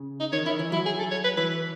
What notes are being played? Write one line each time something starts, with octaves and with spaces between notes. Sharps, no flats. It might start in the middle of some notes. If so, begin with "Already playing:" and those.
Already playing: C#3
D#4
D#3 C#5
D#3 E4
E3
F#3 E4
G#4
A4
C#5
B4
E3 B4